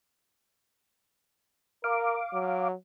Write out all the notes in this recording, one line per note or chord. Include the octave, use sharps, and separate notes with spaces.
A#4 F5 D6
F#3